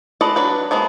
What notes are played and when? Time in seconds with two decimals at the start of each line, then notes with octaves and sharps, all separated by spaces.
0.21 G#3 A4 B4 D5 D#5
0.36 F#3 D4 B4
0.71 F3 G#3 A#3 B3